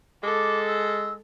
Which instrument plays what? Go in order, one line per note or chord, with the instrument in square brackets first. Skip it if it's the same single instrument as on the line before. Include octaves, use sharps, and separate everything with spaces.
[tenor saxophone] G#3 [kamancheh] A4 [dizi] D6
[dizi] E6